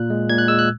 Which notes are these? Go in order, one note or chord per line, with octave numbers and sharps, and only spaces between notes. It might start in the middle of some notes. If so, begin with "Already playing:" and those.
Already playing: A#2 F#6
G#3
A#2 G#6
F#6
G#3 E6
F#6